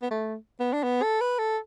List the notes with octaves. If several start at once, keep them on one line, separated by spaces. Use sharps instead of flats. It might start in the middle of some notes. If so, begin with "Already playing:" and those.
B3
A3
B3
D4
B3
A4
B4
A4